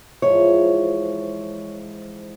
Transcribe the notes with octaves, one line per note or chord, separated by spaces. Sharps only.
G#2 E3 F3 C#5